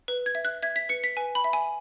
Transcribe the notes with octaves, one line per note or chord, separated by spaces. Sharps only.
B4
G#6
E5
F#6
E5 G#6
B6
B4 C#7
B6
B4 G#5
B5
E5
G#5